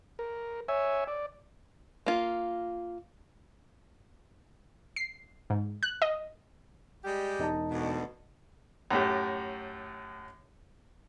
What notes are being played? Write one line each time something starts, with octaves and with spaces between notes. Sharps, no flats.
A#4
C#5 E5 G#5
D5
A#3 F4
C7
G#2
F#6
D#5
G3 G#3 G4
E1 D#4 A5
D2 B2
F#2 A2 G4